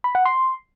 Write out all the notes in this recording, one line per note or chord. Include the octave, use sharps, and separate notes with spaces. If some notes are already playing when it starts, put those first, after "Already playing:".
B5
F#5
C6